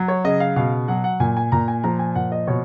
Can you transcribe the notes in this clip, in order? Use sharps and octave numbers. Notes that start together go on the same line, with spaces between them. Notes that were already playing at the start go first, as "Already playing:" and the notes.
Already playing: F#3
C#5
C#3 D#5
F5
B2 F5
F#3 F#5
F#5
A#2 G#5
G#5
A#2 A#5
G#5
F3 A#5
G#5
A#2 F#5
D#5
B2 C#5